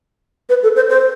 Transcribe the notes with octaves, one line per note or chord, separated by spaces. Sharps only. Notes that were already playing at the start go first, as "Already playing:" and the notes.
B4
A4
C5
C5